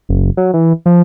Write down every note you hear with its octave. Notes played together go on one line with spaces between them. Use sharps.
F#1
F#3
E3
F3